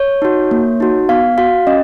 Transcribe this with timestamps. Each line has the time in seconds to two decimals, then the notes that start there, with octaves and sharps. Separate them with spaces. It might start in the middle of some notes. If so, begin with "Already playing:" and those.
Already playing: C#5
0.22 D#4 F#4
0.51 A#3
0.80 D#4 F#4
1.09 B3 F5
1.38 F#4 F5
1.67 C#4 D#5